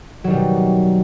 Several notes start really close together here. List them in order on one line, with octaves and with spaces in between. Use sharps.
F#3 D#3 G3 B2